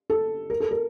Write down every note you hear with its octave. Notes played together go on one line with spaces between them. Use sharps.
A4
A#4
A4
A#4